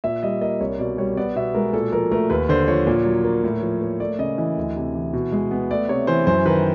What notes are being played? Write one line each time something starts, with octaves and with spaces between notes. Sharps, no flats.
A#2 E5
G3 D#5
A#3 D#5
C2 C#5
B2 D5
G3 C#5
B3 D5
B2 E5
G#3 A#4
A#2 A4
F3 A#4
A3 A#4
D#2 B4
D3 C5
F3 C#5
A#2
F#3
A#3
A2
F3
A#3
A3 D5
C#3 D#5
E3 D#5
D2
C3
E3
B2
G#3
B3
A3 D5
C3 C#5
E3 C5
F#2 C5
D#3 B4